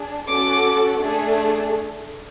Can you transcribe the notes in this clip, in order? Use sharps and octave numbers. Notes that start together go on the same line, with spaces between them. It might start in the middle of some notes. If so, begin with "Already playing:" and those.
Already playing: D4 G#4
C#4 F#4 A4 D6
A3 D4 G#4